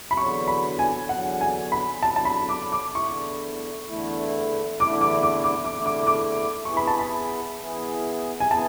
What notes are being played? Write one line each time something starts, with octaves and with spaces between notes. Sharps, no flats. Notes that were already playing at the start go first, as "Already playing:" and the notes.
B5
E2 D3 F#3 C#6
B5
G#5
E2 D3 F#3 F#5
G#5
B5
E2 D3 F#3 A5
A5
B5
D6
D6
E2 D3 A3 E4 C#6
E2 D3 A3 E4
E2 D3 A3 E4 D6
D6
D6
D6
D6
E2 D3 A3 E4
D6
D6
E3 B3 E4 G#4 C#6
B5
A5
B5
E3 B3 E4 G#4
G#5
B3 E4 G#4 A5